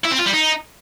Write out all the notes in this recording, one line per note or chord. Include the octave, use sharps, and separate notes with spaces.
E4
C4
F4
G3
D#4